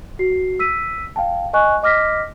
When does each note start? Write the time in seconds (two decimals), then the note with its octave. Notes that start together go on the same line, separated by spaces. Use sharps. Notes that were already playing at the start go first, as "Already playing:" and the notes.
0.19 F#4 C7
0.59 E6 B6 D#7
1.16 F5 G5 A5
1.53 D#5 G#5 C#6 F#6
1.83 D#5 D6 F6 A#6 B6